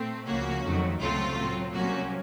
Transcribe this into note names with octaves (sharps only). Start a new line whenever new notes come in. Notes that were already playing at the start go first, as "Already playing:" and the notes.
Already playing: A#2 A3 C4
C#2 C#3 F3 A#3 C#4 F#4
F2 D#3 F#3 A3
C#2 C3 F#3 A3 C4 F4
A2 F#3 C4
C2 C3 F#3 A#3 C#4 F#4